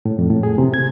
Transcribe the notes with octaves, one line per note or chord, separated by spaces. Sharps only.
A2
F2
A2
G#4
C3
G#6